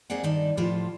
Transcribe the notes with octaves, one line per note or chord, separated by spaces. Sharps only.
G#3 A#3 C4 G#4 D5 F#5
G2 D#3 D#4 D5 A5
A2 F3 F4 G4 A5